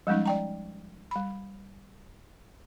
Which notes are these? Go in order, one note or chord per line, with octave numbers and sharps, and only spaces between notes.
F3 G3 G#3 C#4 D#4
D5 G5 A#5
G3 B5